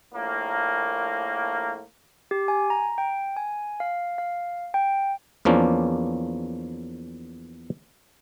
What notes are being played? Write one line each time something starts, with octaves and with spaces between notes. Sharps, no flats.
A#1 A2 A#3
G4
G#5
A#5
G5
G#5
F5
F5
G5
E2 F3 A#3 C#4 D4